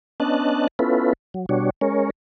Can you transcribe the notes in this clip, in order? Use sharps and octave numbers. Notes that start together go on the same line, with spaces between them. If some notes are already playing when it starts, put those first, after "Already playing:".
B3 C#4 D4 D#5 A5 F#6
B3 C#4 E4 F4 A4 B4
F#3
B2 G3 D4 F#4 C#5
G#3 C#4 A#4 C#5